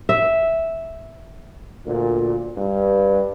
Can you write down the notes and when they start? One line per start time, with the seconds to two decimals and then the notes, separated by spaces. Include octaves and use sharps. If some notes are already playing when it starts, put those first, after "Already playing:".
0.09 E5
1.87 D2 A#2
2.57 G2